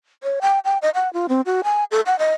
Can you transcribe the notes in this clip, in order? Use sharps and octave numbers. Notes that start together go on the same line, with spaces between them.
C#5
G5
G5
D#5
F#5
F4
C4
F#4
G#5
A4
F#5
D#5